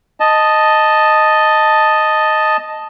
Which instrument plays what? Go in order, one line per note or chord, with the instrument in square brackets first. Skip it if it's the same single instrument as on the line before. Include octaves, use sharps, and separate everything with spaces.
[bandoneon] D#5 A5